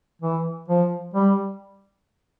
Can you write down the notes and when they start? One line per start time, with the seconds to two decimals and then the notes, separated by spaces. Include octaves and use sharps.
0.22 E3
0.68 F3
1.14 G3